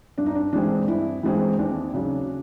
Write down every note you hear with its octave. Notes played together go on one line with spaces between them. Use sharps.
G2 D4
D#4
D4
E3 G#3 C4 D4
G2 E4
E3 G#3 C4
D#2 D4
C#3 F#3